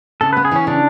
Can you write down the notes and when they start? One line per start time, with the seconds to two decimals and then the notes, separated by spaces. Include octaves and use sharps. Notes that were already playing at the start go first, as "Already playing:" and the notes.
0.21 C#3 A4
0.33 B3 B4
0.45 G#4
0.51 E3 C#4
0.67 C#3 D4